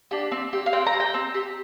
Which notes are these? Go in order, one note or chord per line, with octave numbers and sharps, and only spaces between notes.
D4 G4
C4
G4
F5
C4 G5
A#5
G4
G5
C4
G4